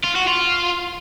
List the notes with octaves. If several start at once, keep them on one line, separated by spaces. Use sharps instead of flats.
F4
F#4
F4